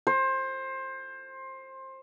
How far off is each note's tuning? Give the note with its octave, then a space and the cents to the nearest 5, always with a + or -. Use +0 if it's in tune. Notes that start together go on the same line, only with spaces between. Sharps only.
C5 +20